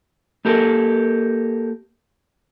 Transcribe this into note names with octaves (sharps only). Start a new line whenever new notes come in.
A#3 G4 A4 A#4